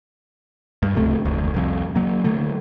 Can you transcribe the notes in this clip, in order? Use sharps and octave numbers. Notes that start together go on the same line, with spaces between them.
G2
D1 C#2 C3 A3
F1 D2
C2 F2
F#3 A#3
D3 F#3 A3